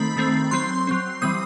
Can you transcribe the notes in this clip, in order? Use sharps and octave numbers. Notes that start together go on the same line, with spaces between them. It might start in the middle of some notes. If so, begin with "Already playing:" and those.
Already playing: D#3 A3 C4 B5
D#3 A3 C4
F#3 C4 C6
F#3 C4
E3 G3 C4 D#6